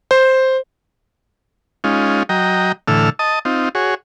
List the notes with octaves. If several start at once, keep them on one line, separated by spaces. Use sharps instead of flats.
C5
G#3 C#4 D#4 F4
F#3 D#5 G5 A#5
A2 D3 E3 A4 E6 F6
D#5 A5 D#6
C4 D#4 F4
F#4 G#4 C#5